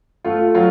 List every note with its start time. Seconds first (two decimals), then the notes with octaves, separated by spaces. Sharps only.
0.25 A3 F4
0.55 F#3 F4